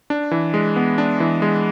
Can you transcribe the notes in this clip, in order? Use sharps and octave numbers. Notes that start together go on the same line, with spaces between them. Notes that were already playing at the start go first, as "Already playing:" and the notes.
D4
E3
G#3
B3
D4
E3
G#3